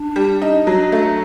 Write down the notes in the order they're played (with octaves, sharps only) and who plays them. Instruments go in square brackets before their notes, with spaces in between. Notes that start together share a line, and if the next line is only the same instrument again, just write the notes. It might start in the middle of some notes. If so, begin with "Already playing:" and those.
Already playing: [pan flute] D4
[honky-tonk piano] G3
D#4
F#3
A3